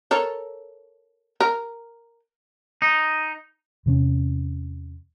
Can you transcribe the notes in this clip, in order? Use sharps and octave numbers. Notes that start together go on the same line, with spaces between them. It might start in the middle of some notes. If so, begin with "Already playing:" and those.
A4 A#4 C#5
A#4
D#4
E2 C3 A#3 C#4